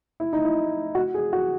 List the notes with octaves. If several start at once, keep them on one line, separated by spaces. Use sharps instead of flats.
E4
D#4
E4
F#4
G#4
F#4